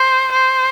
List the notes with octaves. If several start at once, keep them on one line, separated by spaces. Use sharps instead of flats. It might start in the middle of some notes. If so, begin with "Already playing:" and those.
Already playing: C5
C5